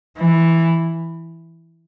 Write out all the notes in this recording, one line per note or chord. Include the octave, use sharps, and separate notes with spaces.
E3